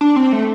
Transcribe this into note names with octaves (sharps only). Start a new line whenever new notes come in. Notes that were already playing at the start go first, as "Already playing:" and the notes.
D4
C4
A3